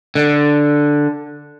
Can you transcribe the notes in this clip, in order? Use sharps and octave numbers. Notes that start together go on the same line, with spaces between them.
D3